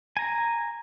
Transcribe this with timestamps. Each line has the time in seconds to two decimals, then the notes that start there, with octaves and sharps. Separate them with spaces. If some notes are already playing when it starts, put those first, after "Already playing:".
0.17 G#5 A#5